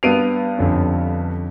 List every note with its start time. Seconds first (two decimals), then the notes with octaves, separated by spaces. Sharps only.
0.03 G2 B3 C7 D7 D#7 F7
0.58 F2 D3 C#4